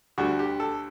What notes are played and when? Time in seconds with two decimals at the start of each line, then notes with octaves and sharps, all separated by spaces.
0.18 D2 D3 G3 F#4
0.39 G4
0.60 A4